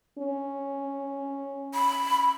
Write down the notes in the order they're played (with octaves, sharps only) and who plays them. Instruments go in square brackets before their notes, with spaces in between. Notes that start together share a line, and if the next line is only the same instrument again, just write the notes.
[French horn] C#4
[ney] B5